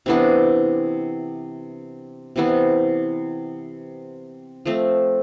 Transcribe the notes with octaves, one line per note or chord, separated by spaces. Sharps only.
C3 E3 B3 D4
C3 E3 B3
F3 A3 C4